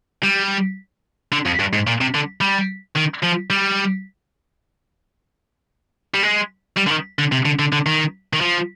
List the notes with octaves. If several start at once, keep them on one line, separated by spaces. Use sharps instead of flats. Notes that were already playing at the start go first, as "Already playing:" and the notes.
G3
D3
F2
G2
G#2
A#2
C3
D3
G3
D#3
F3
G3
G3
G#3
G3
D3
D#3
D3
C3
D3
D3
D3
D#3
D#3
F3